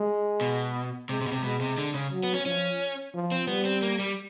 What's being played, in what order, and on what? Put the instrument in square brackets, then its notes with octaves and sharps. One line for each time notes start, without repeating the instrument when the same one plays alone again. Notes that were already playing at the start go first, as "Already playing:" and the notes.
Already playing: [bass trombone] G#3
[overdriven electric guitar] B2
[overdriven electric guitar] C3 [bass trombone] G#3
[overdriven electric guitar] C3
B2
C3
[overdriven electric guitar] B2 [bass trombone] G#3
[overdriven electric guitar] C3
D3
C#3
[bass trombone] F#3
[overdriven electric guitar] B3
C#4
[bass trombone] F3 [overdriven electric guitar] C#4
[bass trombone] F3
[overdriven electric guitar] C4
[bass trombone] G3 [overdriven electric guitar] B3
[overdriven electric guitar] C4
A#3
G3